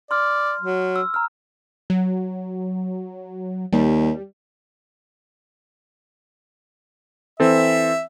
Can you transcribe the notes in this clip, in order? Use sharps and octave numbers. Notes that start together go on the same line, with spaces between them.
D5 C6 F6
F#3
E6
A#5 F6
F#3
D#2 G3
E3 C4 A4 E5